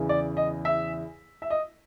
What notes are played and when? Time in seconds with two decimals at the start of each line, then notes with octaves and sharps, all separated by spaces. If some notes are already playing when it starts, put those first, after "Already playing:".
Already playing: E2 C#3 E3
0.09 D5
0.37 D#5
0.65 E5
1.42 E5
1.50 D#5